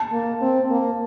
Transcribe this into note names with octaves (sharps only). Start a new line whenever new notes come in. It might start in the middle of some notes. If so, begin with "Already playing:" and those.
Already playing: A5
A#3
C4
A#3